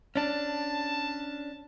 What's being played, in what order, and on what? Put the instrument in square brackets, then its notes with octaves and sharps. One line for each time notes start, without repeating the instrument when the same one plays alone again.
[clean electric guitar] C#4 D4 [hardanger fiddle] A5